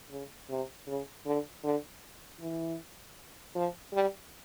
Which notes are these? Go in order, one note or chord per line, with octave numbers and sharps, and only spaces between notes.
C#3
C3
C#3
D3
D3
E3
F3
G3